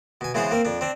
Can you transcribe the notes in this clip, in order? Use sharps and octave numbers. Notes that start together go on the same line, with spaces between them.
B2 G#5
C#3 E3 G#3 B3 G#4 C5
A#3 C4 A#4
F2 D4
C4 D4